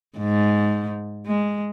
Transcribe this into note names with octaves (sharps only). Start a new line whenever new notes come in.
G#2
G#3